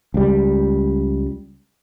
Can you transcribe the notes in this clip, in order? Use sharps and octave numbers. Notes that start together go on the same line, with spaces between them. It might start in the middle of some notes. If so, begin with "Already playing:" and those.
C#2 G3